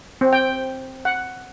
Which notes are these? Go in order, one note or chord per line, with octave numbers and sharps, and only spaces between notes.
C4
G5
F#5